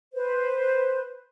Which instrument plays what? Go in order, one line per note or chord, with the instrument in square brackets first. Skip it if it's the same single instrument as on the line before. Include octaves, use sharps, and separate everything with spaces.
[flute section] B4 C5